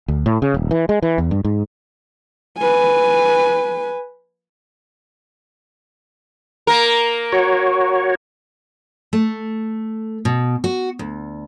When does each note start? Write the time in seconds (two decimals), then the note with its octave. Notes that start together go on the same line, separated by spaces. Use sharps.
0.08 D2
0.26 A2
0.42 C#3
0.54 D#1
0.71 E3
0.89 G#3
1.02 E3
1.18 E2
1.31 G2
1.45 G#2
2.58 B4 G#5
6.67 A#3 A#4
7.32 F#4 C#5
9.13 A3
10.25 B2
10.64 F#4
10.99 D2